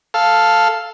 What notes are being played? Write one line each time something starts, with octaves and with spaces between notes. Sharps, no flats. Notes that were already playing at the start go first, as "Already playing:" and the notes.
A4 F5